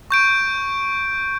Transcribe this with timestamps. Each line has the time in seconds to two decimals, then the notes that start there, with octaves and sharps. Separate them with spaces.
0.11 C#6 G6 D7